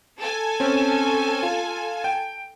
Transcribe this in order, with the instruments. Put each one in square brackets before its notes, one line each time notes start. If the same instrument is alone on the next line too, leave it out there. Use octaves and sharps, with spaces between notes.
[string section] A4 G#5
[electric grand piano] C4 C#4
F4
G5